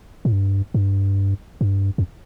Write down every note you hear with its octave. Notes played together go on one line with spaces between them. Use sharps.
A2
G2
G2
G2
F2